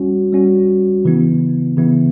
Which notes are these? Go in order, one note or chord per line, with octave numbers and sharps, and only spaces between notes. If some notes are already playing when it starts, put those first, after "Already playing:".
Already playing: G3 C#4 F#4
G3 C#4 F#4
C#3 E3 B3 E4
C#3 E3 B3 E4